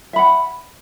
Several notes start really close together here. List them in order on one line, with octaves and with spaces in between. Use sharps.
E5 B5 F#5